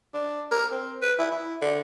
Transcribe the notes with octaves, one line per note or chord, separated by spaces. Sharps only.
D4
A#4
C4
B4
E4
E4
D3